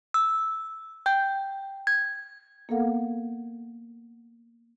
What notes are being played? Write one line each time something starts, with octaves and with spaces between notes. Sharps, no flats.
E6
G5 G6
G#6
A#3 B3 A4 A#4 F5 F#5